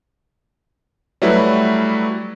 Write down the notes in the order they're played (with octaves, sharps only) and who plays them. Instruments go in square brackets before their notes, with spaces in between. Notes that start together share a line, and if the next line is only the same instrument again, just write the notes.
[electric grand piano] F#3 G3 A3 E4 B4